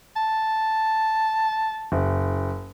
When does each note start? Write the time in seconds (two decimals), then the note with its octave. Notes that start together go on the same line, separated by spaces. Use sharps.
0.16 A5
1.92 F#1